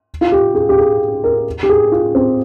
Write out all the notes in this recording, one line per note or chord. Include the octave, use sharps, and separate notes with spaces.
F4
G4
G#4
G4
G#4
A#4
G4
G#4
F4
C4